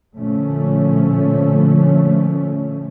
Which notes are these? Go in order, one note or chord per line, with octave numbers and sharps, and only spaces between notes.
A#2 D3 F3 A3 C#4